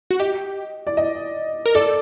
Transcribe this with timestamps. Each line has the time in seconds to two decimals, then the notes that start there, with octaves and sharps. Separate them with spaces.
0.11 F#4
0.20 G4 D#5
0.87 D5
0.97 D#5
1.66 A#4
1.75 A4 D5